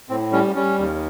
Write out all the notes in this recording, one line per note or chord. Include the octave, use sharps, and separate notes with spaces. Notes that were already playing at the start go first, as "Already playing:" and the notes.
A2 C4
G3 C#4
G3 C#4
D#2